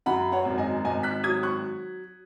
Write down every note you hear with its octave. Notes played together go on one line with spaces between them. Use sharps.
F#2 F#5 B5
C#5 F#5
G#1
D#5 G#5
G#1 D#5 G#5
F#6 B6
F#3 D#6 G#6
C#6 F#6